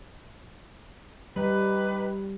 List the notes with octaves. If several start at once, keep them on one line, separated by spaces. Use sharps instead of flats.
G3 D#4 G4 B4